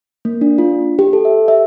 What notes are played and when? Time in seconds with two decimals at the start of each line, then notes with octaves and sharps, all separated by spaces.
0.25 A#3
0.41 D4
0.58 F4
0.99 G4
1.13 A4
1.25 E5
1.48 E5